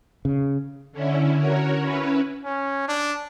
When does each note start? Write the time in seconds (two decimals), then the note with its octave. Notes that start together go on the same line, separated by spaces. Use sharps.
0.25 C#3
0.92 D3 C#4 E4
1.37 F#4 A#4 C#5
1.82 C#4 E4 B4
2.45 C#4
2.88 D4